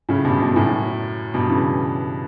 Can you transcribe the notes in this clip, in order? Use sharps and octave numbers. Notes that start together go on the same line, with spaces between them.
A2 C#3
G2 B2
G2 B2
F#2 A2
G2 B2
C#3 E3